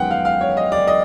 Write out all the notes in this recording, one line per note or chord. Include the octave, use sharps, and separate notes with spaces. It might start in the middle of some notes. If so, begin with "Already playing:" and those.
Already playing: F#2 D#3 G#3 B3 F#5 G5
F5
F5
C#5
D#5
D5
D#5